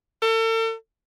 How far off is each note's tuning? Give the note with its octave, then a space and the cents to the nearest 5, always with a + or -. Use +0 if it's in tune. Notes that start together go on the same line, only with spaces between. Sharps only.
A4 +40